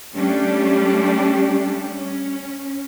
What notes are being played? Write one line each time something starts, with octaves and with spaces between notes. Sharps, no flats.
G3 A3 C#4 D4 G4
C#4